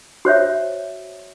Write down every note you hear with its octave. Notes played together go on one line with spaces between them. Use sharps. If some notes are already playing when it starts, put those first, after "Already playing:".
F#4 C5 C#5 E5